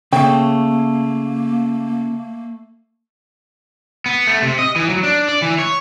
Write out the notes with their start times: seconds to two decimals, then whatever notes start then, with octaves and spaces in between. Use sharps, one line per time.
0.13 C#3 A3 A#3 G5
4.06 B3
4.27 A3
4.42 C3
4.59 D#5
4.76 E3
4.90 F#3
5.03 D4
5.29 D5
5.42 E3
5.59 C#5